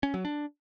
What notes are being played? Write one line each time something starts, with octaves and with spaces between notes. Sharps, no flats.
C#4
F#3
D4